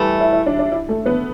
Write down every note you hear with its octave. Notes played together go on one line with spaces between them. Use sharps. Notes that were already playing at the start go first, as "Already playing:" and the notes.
Already playing: E3 G3 A3 G4
E4
E4
D4
D4
E4
A3 A4
B3 B4